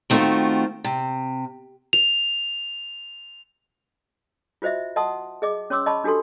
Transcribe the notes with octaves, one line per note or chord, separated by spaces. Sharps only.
D#3 A3 B3 C4 F4 F#4
C3
F7
F4 F#4 C5 D#5 E5
D#5 F#5 A5 C6 D#6
G#4 D#5 D6
C#4 C#5 C6 D6 E6
D#5 A5 B5 C#6
D4 F#4 G4 A4 C6